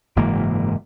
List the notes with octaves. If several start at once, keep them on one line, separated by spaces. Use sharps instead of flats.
F#1 G#2 E3 A#3